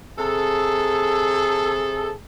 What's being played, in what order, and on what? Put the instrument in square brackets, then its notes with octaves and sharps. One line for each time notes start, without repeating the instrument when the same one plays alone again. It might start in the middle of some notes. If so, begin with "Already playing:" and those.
[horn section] C3 G#4 A4